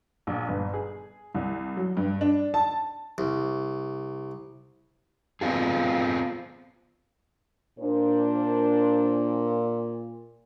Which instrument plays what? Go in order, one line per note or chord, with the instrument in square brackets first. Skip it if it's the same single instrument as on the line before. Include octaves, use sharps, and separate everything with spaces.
[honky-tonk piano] A#1
G1
G#4
C2
F#3
G2
D4
A5
[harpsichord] C2
[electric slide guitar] B3 C4 F4 G#4
[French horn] A#2 [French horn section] D4 A#4 C5